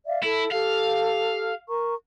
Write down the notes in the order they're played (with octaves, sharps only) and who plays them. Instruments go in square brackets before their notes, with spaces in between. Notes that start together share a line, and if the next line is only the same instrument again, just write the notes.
[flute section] D5 E5 F5
[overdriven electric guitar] E4 [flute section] A4
[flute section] G4 A4 [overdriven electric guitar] F5
[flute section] A#4 A#5 C#6